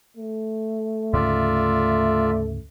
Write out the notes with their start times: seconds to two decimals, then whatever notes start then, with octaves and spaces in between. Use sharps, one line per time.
0.17 A3
1.13 D2 G#2 C#3 F4 D5 E5